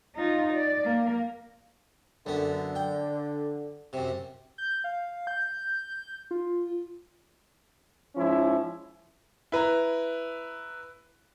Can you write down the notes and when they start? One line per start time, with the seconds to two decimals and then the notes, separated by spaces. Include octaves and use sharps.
0.16 D#4 F4
0.53 D5
0.85 A#3
2.26 F#2 D3 B3
2.75 G5
3.93 F#2 C3
4.58 G6
4.84 F5
5.27 G6
6.31 F4
8.16 G#2 F3 C#4 E4
9.52 E4 B4 A#5